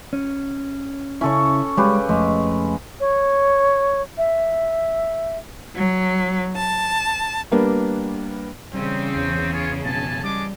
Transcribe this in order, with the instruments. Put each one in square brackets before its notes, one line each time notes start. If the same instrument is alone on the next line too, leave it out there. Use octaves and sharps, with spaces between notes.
[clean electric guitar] C#4
[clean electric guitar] C#3 E4 [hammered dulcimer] C#4 A4 C#5
[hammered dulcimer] C#3 G4 B4 [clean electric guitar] G3 G#3
[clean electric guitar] F2 A3 [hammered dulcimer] G#3
[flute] C#5
E5
[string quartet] F#3
A5
[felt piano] G3 A#3 B3 D4
[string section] C#3 E3 [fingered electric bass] G3 [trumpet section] C4
[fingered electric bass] E2
[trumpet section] F4 G#4 C#5
[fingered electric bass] F2 B2 [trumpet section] G#5 A5
[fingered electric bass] G3 [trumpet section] G#3 A5 D6